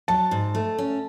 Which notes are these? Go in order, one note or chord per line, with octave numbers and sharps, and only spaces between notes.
F#3 A5
G#2
A3
C#4